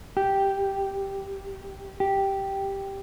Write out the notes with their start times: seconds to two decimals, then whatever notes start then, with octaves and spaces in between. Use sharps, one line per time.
0.17 G4
2.00 G4